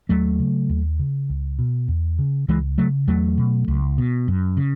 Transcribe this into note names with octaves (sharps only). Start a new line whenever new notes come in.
D#2 F#3 A3
C#3
D#2
C#3
C#2
B2
E2
C#3
C#2 E3 G#3
C#3 F#3 A3
E2 F#3 A3
B2
C#2
B2
F#2
C#3